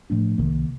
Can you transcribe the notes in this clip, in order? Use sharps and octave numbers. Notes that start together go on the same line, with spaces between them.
A2 F3 A3 D4
C2 C3 D#3 A#3